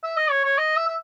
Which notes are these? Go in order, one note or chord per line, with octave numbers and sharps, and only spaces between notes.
E5
D#5
C#5
C#5
D#5
E5
E5